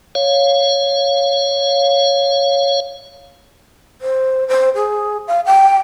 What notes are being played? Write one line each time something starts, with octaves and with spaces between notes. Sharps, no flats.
C#5 F5
C5
C5
G#4
F5
G5